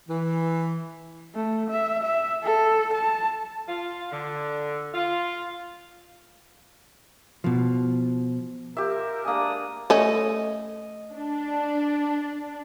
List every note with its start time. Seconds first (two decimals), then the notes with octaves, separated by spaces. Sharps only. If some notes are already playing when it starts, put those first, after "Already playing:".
0.09 E3
1.35 A3
1.70 E5
2.03 E5
2.44 A4
2.93 A5
3.68 F4
4.12 D3
4.94 F4
7.44 B2 F3
8.77 F4 G4 A#4 E5
9.25 G#3 A#3 D4 G#5 D#6
9.90 A3 C#4 D#5
11.14 D4